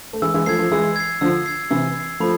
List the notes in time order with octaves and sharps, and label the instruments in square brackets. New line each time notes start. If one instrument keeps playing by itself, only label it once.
[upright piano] A3
[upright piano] E3 G#3 [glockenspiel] E6
[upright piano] E3 G#3
[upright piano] F3 A3 [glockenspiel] G#6 C7
[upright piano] F3 A3
[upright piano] E3 G#3 [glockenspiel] E6
[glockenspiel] G#6 C7
[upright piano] D3 F3 [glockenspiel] E6
[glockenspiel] G#6 C7
[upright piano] C3 E3 [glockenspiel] E6
[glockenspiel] G#6 C7
[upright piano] F3 A3 [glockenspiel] B5